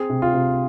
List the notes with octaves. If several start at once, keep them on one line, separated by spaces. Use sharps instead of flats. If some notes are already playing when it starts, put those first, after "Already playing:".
Already playing: C4 G#4
C3
F4
C3